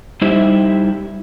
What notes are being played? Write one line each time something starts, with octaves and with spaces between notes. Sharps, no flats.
G3 D#4 E4 G4 C5 E5